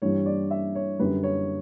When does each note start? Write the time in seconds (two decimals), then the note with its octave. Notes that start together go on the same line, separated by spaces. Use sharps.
0.02 G2 E3 G3 C#5
0.26 D5
0.51 E5
0.75 C#5
0.99 F#2 D3 G3 B4
1.23 C#5